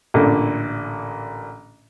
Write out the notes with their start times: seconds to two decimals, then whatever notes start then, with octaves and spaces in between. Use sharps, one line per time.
0.14 A1 A#2 D3